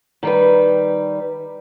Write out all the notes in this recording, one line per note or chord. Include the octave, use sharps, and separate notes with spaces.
D#3 G3 B4